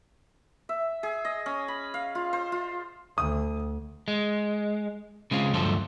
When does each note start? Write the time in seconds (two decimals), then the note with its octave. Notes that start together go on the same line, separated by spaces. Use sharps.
0.69 E5
1.03 G#4
1.25 D#5
1.46 C#4
1.68 B5
1.94 F5
2.15 F4
2.33 C5
2.52 F4
3.18 D2 D#6
4.08 G#3
5.31 C#3 G#3 C4 F4
5.54 D2 G2 F3 F#3 A4 C5